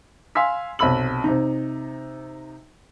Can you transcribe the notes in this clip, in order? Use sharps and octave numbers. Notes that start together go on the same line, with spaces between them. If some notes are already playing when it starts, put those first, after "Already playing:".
F5 G#5 C6 E6 B6
B1 C3 B5 E6 F#7
C3 D#4